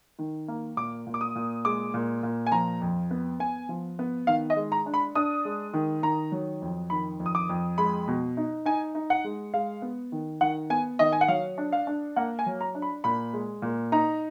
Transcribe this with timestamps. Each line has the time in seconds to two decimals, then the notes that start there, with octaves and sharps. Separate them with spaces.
0.19 D#3
0.48 A#3
0.77 A#2 D6
1.07 A#2
1.14 D6
1.21 D#6
1.35 A#2
1.65 G#3 D6
1.94 A#2
2.23 A#2
2.47 G#5
2.52 F3 A#5
2.82 F2
3.11 B3
3.40 B3 G#5
3.69 F3
3.99 B3
4.27 D#3 F5
4.50 D#5
4.56 G#3
4.72 A#5
4.86 D4
4.94 B5
5.15 D4 D#6
5.45 G#3
5.74 D#3
6.02 D#3 A#5
6.32 F#3
6.62 F2
6.90 D#3 B5
7.20 F2
7.26 D#6
7.35 D6
7.49 F2
7.78 G#3 B5
8.08 B2
8.37 D#4
8.66 D#4 G#5
8.95 D#4
9.10 F#5
9.24 G#3
9.54 G#3 F5
9.82 B3
10.12 D#3
10.41 D#3 F#5
10.70 B3 G#5
10.99 D#3 D#5
11.12 G#5
11.21 F#5
11.28 F#3 F5
11.58 D4
11.72 F5
11.87 D4
12.16 A#3 F#5
12.39 G#5
12.46 F#3
12.61 A#5
12.75 D4
12.82 B5
13.04 A#2 B5
13.33 G#3
13.62 A#2
13.92 D#4 A#5